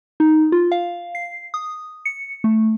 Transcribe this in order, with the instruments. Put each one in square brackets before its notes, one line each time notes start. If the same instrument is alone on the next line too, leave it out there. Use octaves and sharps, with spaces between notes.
[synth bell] D#4
F4
F5
C7
D#6
C#7
A3